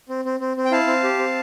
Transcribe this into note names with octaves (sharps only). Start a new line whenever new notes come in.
C4
C4
C4
C4
G5
E4 F5 A5
C4
G4
C4